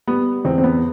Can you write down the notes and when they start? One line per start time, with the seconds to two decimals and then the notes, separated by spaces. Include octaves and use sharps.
0.07 G3 B3
0.45 E2 C4
0.58 C4
0.64 B3